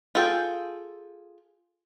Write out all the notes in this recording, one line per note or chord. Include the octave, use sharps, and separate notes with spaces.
F4 G#4 A4 G5